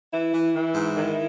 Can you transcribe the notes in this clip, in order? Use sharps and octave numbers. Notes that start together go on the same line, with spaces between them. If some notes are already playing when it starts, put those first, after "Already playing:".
E3 E4
E3
E3
G#2
D#3